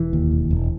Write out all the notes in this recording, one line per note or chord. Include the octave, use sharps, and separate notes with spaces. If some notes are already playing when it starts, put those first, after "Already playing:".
Already playing: E1 E3
D#2
E1
E1